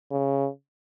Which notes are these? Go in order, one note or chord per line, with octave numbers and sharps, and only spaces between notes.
C#3